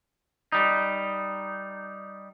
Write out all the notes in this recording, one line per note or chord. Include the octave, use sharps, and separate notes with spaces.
G3 D#4